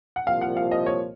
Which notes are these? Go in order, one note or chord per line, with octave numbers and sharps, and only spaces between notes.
F#5
C2 A#2 F3 F5
F#5
F5
D#5
C#5